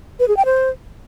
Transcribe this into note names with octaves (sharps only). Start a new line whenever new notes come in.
B4
G#4
G5
C5